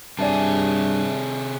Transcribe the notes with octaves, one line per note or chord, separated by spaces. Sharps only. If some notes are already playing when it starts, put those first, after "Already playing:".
G2 C3 G#4 D5 E5 A5